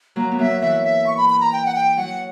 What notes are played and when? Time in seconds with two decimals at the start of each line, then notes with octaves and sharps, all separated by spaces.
0.16 F#3 A#3 A#5
0.32 B3
0.39 F#3 A#3 E5
0.62 E3 E5
0.84 E5
1.07 C#6
1.17 B5
1.30 B5
1.40 A#5
1.52 G5
1.65 F#5
1.75 G5
1.97 F#3 F#5